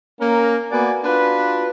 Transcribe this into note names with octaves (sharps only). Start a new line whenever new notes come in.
A#3 C#4 A#4
A#3 B3 F#4 D5 F#5 G#5
D4 F4 F#4 B4